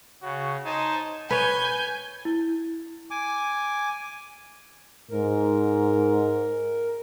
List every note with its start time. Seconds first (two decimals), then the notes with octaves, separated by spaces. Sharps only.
0.22 C#3 F#4
0.65 D#4 C5 G#5 A5
1.31 B4 C#5 G#5 G6
2.25 E4
3.11 G#5 D6
5.11 G#2 A#4